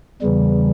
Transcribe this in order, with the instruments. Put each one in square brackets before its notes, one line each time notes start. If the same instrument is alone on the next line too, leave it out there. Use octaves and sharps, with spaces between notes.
[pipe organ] E2 C#3 E3 G3